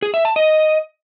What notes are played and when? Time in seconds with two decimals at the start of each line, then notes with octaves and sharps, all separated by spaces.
0.02 G#4
0.14 E5
0.25 A5
0.36 D#5